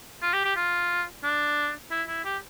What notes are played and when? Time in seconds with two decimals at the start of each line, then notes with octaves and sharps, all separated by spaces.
0.22 F4
0.33 G4
0.45 G4
0.56 F4
1.23 D4
1.90 E4
2.08 E4
2.25 G4